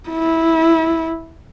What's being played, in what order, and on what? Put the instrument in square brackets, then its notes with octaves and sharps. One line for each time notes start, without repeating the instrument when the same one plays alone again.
[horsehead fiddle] E4